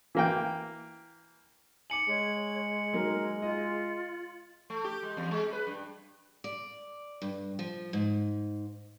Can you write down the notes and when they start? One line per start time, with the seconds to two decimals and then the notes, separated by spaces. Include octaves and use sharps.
0.15 E3 A#3 G5
1.90 G#5 D6 C#7 F#7
2.08 G#3 C#5
2.93 D#3 F#3 A#3 A#4
3.42 F4 D#5
4.70 A3
4.84 G4
5.03 G#3
5.17 E2
5.31 G#3
5.53 B4
5.67 G2
6.44 D5
7.22 G2
7.59 F3
7.93 G#2